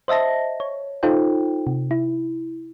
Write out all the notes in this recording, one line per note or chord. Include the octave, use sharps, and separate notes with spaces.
C5 D#5 E5 A5 A#6
C#5
D#4 F4 A4 C5 G5
C3
E4